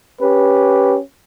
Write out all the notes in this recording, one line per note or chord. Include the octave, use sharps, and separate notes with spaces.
C#4 G4 B4